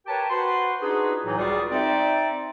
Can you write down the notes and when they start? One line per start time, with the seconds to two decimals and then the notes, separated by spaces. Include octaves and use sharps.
0.07 G4 A#4 B4 C#5 G5 A5
0.30 F#4 B4 C5 F#5 C6
0.83 D4 D#4 F4 F#4 G#4 B4
1.26 A2 E3 F#3 D#4
1.37 C#2 G3 F4 F#4 G#4
1.71 C4 D#4 D5 E5